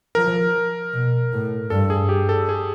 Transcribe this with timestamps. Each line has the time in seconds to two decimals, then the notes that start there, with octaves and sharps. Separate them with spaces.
0.15 F3 A#4
0.93 B2
1.32 A2
1.70 G2 A4
1.90 G#4
2.09 G4
2.29 A4
2.49 G#4